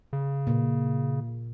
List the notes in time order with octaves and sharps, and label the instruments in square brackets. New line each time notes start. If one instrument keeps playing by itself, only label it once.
[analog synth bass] C#3
[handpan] A#2